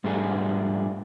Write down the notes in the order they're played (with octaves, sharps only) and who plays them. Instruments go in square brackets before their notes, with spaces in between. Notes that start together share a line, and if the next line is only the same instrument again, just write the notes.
[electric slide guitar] G#2 G3 A3 D4 G#4